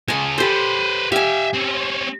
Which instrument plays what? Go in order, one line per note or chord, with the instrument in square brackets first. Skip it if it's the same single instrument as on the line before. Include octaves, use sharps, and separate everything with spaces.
[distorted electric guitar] C#3 G#3 [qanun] G#5 A5
[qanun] G4 A4 [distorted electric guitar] B4 C5
[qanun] G4 G#5 [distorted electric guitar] E5 F5
[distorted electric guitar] C4 C#4